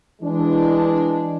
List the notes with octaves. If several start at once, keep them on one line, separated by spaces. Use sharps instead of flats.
E3 G#3 D4